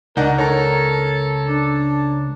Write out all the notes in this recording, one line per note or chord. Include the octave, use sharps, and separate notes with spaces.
C#2 D4 D#4 A#4 F#5 A#5
A4 C#5 A#5
D4